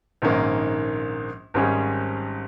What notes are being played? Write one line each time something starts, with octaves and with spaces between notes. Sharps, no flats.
A#1 G#2 D#3 A#3 C#4
G#1 G#2 G3 C#4 G#4